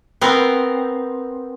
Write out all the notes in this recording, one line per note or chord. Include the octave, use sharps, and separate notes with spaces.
B3 C4 A#4